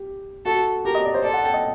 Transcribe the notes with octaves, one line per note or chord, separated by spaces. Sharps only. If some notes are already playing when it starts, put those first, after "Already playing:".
Already playing: G4
F#4 A4
G4 A#4
D#5
D5
C5
A4 D5
F#5
G5
D#5